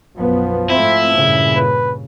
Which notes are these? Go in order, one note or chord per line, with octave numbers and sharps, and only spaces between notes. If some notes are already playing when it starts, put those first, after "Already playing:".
B1 F#2 F3 B3
G#2 A3 C4 E4
G2 A#2 C#3
B4